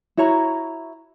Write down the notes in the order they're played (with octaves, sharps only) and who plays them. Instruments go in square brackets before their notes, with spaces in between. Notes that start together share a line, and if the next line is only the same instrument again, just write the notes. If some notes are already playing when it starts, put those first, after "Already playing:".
[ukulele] E4 F#4 C#5 A#5